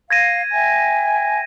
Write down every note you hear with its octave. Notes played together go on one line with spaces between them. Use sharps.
F5 G#6 A#6 D#7
E5 G5 G#5